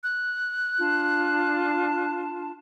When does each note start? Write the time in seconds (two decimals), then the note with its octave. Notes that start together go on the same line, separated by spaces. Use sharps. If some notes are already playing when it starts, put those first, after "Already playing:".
0.04 F#6
0.78 D4 F4 A5